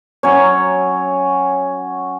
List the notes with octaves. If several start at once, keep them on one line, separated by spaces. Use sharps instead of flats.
F#3 C#4 C#5